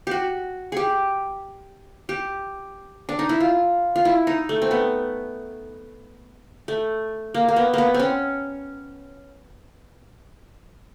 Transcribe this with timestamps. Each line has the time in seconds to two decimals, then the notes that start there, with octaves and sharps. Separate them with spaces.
0.07 F#4 G4
0.72 G4 G#4
2.09 G4
3.09 D4
3.19 D#4
3.29 E4
3.40 F4
3.96 F4
4.05 E4
4.27 D#4
4.49 A3
4.62 C4
4.71 B3
6.68 A3
7.34 A#3
7.48 A#3
7.56 B3
7.74 A#3 B3
7.94 C4 C#4